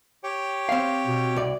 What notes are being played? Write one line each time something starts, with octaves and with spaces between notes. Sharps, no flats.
G4 C#5 G5
C4 F5
B2
C2 D5